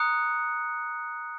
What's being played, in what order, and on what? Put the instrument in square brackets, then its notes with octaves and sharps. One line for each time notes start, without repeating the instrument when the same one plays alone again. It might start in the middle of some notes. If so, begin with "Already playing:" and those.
Already playing: [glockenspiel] A#5 D#6 F#6 C#7